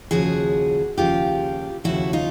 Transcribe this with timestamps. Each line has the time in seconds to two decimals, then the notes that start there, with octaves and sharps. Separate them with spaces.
0.11 D#2 C#3 F3 F#4 G#4
0.98 D#2 C#3 F3 F4 G4
1.84 D#2 C#3 F3 E4 F#4
2.13 D#4 F4